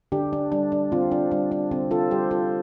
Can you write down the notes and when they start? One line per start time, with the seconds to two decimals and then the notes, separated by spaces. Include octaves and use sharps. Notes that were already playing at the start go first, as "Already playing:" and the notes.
0.12 D3 D4 G4
0.33 D4
0.52 G3 D4
0.72 D4
0.92 D3 C4 F4
1.12 D4
1.31 G3 D4
1.52 D4
1.71 D3 C4
1.91 F4 A4
2.11 G3 G4 C5
2.31 F4 A4